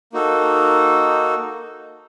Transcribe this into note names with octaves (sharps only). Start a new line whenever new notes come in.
A#3 D#4 F#4 A4